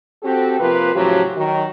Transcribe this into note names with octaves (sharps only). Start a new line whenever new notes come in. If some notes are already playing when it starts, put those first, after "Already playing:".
C4 F#4 G4 A4
C3 F3 A#3 F4 B4
A2 C#3 F3 F#3 F#4 G4
D#3 F#3 F#4